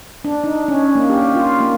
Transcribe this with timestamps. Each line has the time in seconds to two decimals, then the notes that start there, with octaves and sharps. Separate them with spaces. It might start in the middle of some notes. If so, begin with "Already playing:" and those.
0.24 D4
0.44 D#4
0.68 C#4
0.95 A#3
1.09 G4
1.35 F4
1.60 A#3